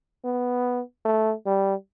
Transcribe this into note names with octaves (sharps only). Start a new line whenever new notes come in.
B3
A3
G3